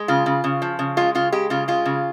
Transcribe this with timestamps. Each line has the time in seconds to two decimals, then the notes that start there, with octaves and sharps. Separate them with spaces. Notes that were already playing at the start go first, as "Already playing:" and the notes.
Already playing: G#3
0.08 C#3 F4
0.26 C#3
0.44 C#3
0.62 F3
0.79 C#3
0.97 G#3 F4
1.15 C#3 F4
1.32 G#3 G4
1.50 C#3 F4
1.68 G#3 F4
1.85 C#3